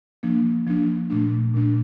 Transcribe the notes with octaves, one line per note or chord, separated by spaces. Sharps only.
F3 A#3 D4
F3 A#3 D4
A#2 A3 D4
A#2 A3 D4